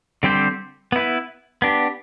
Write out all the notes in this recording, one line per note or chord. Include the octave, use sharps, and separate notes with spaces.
D3 G3 C4 G4 C5
B3 E4 B4
B3 D4 G4